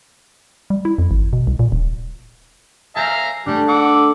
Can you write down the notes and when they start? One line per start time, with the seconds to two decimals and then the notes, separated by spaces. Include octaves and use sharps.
0.70 G3
0.85 E4
0.98 F2
1.11 G#1
1.33 B2
1.47 C2
1.59 A#2
1.72 D#1
2.96 E5 F5 G#5 A#5 G6 A#6
3.46 G3 A3 D4
3.68 F#5 D6 E6